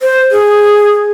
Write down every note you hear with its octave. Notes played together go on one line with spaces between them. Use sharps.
C5
G#4